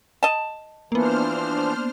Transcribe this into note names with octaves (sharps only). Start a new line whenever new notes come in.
D#5 A5
E3 F3 A#3 B3 D4 C5 F6